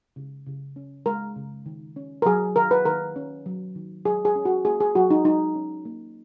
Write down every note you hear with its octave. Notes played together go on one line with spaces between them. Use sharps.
C#3
C#3
C#4
G#3 A#4
C#3
D#3
C#4
A#4
F#3 G#4
D#3 A#4
B4
D#3 A#4
C#4
F#3
D#3
F#3 G#4
G#4
C#4
F#4
A#3 G#4
G#4
F#3 F#4
D#4
F#3 D#4
C#4
A#3